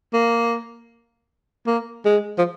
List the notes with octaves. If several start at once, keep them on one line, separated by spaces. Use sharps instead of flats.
A#3
A#3
G#3
F3